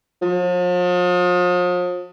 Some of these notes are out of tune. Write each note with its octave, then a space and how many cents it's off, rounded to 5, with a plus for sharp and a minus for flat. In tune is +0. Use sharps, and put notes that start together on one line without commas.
F3 +40